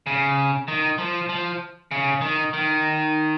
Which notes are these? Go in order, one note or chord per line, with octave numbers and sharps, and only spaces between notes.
C#3
D#3
F3
F3
C#3
D#3
D#3